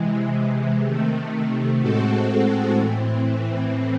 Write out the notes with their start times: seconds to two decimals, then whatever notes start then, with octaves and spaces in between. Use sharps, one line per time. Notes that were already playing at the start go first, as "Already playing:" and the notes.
Already playing: C3 E3 G#3
0.84 C3 D#3 A3
1.79 A2 G#3 C4 F#4 A4
2.76 A2 E3 C4